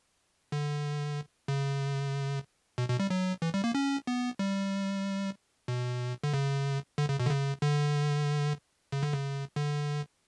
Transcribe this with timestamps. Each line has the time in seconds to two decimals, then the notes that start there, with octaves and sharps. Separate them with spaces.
0.52 D3
1.48 C#3
2.78 B2
2.89 B2
2.99 G3
3.10 F#3
3.42 E3
3.54 G3
3.64 A#3
3.75 C#4
4.07 B3
4.39 G3
5.68 B2
6.24 D3
6.34 C#3
6.98 D3
7.09 C#3
7.20 B2
7.26 D3
7.30 C#3
7.62 D3
8.92 C#3
9.03 D3
9.13 C#3
9.56 D3